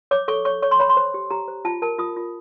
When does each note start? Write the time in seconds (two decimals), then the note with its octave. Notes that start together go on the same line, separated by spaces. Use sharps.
0.11 C#5 D6
0.28 A4 C#6
0.45 C#5 C#6
0.62 C#5 C#6
0.71 C6
0.80 C#5 B5
0.89 C6
0.97 C5
1.14 G4
1.30 G4 A#5
1.48 C5
1.65 F4 A5
1.82 A#4 A5
1.99 F4 D#6
2.16 F4